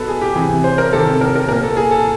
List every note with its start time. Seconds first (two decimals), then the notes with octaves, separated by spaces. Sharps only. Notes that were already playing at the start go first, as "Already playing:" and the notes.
Already playing: B2 A4 B4
0.08 G#4
0.21 G4
0.35 C3 E3 G#4
0.64 C5
0.78 A#4
0.93 C3 D#3 A4
1.21 A#4
1.35 A#4
1.48 A#2 A#4
1.63 A4
1.77 G#4
1.91 A4